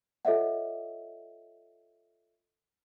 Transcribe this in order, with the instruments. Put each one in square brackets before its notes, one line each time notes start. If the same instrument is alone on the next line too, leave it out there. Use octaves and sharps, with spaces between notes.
[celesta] F4 A4 C#5 D#5 E5 F#5